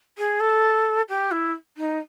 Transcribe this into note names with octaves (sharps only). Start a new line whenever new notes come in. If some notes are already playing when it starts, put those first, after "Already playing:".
G#4
A4
G4
E4
D#4